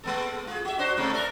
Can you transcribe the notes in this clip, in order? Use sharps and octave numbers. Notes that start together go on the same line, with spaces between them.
G#3 B3 A4
F4 G#4
F#4 E5
D4 F#4 C5
A2 C3 A3
D4 A4 A#4